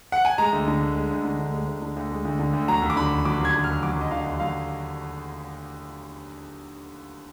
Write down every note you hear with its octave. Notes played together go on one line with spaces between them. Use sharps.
F#5
G#5
G#3 A#5
D2
D3
D2
G#3
D2
D3
D2
G#3
D2
D3
D2
G#3
D2
D3
D2
F#3 A#5
D#2
D6
D3 B5
D#2
F#3 D6
D#2 G#6
D3
D#2 F6
F#3 D6
D#2 D#5
D3 F5
D#2
F#3 F5